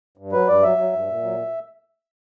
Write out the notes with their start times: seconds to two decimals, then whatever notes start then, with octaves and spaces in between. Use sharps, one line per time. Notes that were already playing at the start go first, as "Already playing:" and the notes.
0.17 G2
0.32 F#3 B4
0.48 G2 D5
0.62 F#3 E5
0.78 F#3
0.93 G2
1.09 A#2
1.23 F#3